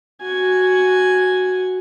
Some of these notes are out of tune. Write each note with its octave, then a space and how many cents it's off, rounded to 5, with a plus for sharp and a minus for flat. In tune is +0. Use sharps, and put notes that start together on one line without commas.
F#4 +0 G#5 +0